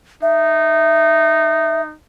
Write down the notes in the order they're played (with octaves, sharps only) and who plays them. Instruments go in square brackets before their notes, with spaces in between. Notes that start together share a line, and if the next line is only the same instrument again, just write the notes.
[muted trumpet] D#4 [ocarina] E5